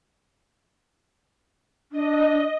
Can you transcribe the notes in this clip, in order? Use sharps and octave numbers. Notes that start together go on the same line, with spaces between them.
D4 D#5